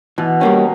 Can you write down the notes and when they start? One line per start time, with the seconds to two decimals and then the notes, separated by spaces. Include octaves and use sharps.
0.18 B2 E3
0.40 D#3 G3 A#3 C#4